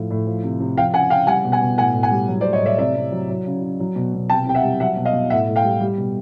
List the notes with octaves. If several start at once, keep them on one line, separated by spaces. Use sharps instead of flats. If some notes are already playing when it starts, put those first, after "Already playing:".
Already playing: A2 F3
A2
F3
C3
C3
F3 F5 G5
C#3 F#5 G#5
C#3 F5 G5
G3 F#5 G#5
B2
F#5 G#5
B2
A2 F#5 G#5
A2
F#5 G#5
G3
F#3
C5 D5
A2
C#5 D#5
A2 D5 E5
C3 D5 E5
C3
F#3
F#3
C#3
C#3
F#3
B2
B2
C3 G5 A5
C3 G5
E5 F#5
G3
F#3 E5 F#5
B2
D#5 F5
B2
A2 E5 F#5
A2
F5 G5
G3
G3
B2